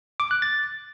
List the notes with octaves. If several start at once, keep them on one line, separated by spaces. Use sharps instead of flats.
D6
F#6
A6